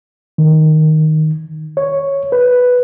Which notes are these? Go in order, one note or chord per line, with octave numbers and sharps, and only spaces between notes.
D#3
C#5
B4